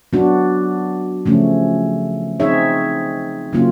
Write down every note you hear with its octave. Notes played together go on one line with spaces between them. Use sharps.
F#3 B3 D4 F#4
C#3 F3 A3 C#4
C4 D#4 G#4 C#5 E5
C#3 F#3 A#3 C#4 F4